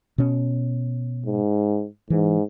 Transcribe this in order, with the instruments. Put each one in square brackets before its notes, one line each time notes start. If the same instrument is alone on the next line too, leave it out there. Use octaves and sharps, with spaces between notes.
[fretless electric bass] B2 C#4
[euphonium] G#2
[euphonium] G#2 [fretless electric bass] E3